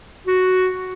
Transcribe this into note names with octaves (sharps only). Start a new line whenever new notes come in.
F#4